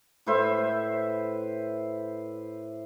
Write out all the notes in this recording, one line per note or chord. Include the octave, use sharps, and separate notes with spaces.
A2 B4 C5 E5